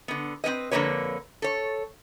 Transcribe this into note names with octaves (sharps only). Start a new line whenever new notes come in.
D3 B3
C4 C#4 B4 D#5
F2 D3 E3 A#3 B4 C#5
A4 C#5